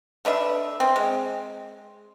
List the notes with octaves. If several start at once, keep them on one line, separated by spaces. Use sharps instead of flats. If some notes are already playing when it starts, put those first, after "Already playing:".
A3 D4 B4 E5
C4
G#3